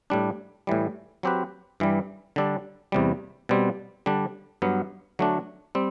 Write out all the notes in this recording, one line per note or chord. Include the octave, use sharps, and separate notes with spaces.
A2 G3 D4
A2 E3 G3
F#3 C4 G4 B4
G2 E3 G3
D3 G3 D4 A4
E2 C3 G3
B2 G3 C4
D3 G3 D4
G2 F#3 B3
D3 F#3 A3 D4
G3 C4